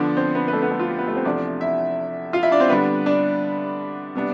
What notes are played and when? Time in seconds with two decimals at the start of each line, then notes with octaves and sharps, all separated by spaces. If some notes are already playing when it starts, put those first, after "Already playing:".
Already playing: D3 F3 B3 D4 D5
0.17 C4 C5
0.35 B3 B4
0.48 B4
0.53 A3 A4
0.62 B3 B4
0.71 A3 A4
0.79 F4
0.89 G4
0.99 B3 B4
1.07 A3 A4
1.16 C4 C5
1.25 E2 C3 F3 A3 D4 D5
1.61 E4 E5
2.33 F4 F5
2.43 E4 E5
2.51 D4 D5
2.60 C4 C5
2.69 D3 G3 B3 D4 B4
3.06 D4 D5
4.15 C3 G3 B3 D4